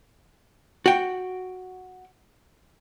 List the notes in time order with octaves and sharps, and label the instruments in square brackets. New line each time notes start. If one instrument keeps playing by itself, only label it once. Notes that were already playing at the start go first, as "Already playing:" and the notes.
[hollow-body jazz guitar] F#4 G5